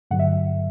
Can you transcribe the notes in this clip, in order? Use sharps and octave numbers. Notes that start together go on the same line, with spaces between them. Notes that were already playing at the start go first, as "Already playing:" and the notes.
G2 D3 F#3 F#5
E5